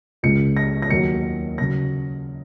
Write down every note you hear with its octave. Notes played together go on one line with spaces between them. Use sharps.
C#2 C#3 G#3 C#7
A#6
A#6
D#2 D#3 F#3 C#7
C#3 F#3 A#6